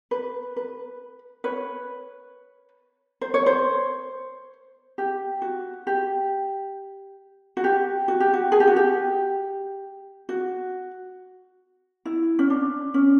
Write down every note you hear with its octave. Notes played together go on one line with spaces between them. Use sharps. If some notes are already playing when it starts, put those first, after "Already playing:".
B4
B4
B4 C#5
C5
C#5
C5
G4
F#4
G4
F#4
G4
F#4
G4
F#4
G#4
G4
F#4
G4
F#4
E4
C#4
D4
C#4